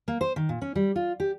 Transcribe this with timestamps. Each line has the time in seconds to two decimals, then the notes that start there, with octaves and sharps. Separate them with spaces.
0.08 A#3
0.21 C5
0.36 D#3
0.49 A#2
0.62 C#4
0.75 G3
0.96 F4
1.20 G4